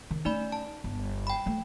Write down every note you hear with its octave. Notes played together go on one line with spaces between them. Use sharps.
D#3
A3 C#4 D#4 D5 B5
A5
G1
G5 B5
F3 A3